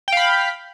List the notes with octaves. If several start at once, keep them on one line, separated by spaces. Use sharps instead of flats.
F5 G5 B5